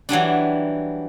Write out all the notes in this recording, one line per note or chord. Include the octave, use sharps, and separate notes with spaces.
E3 F#3 G3 D4